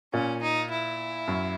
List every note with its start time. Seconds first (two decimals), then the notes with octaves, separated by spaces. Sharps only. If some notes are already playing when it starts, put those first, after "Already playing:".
0.13 A#2 C#4
0.42 D#4
0.71 E4
1.28 F#2